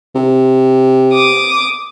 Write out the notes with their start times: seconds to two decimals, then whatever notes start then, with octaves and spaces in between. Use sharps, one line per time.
0.15 C3
1.11 D6 D#6